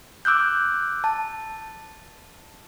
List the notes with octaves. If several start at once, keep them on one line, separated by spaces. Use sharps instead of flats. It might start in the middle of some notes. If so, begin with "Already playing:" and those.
D6 E6 F#6 G6
A5